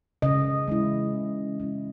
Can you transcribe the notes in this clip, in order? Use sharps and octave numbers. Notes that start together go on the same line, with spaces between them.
C#3 D#5
G#3 C#4 E4
C#3
G#3 C#4 E4